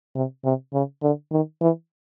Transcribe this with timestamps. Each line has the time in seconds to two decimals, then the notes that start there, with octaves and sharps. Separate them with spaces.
0.15 C3
0.44 C3
0.73 C#3
1.02 D3
1.32 D#3
1.61 E3